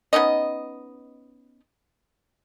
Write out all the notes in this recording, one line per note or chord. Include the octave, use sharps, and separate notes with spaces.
B3 C#4 D#4 D#5